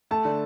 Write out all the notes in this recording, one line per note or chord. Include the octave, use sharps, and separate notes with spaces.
A3 A5
D3